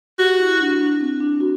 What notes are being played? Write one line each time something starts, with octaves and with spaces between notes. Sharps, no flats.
F#4 G4
E4
D4
D4
C4
D4
F#4